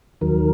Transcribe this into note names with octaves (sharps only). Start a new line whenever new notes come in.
D#2 D#3 F#3 A#4